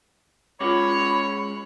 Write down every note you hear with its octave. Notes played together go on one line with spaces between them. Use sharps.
G#3 C#4 F4 F#4 C#5 B5 D6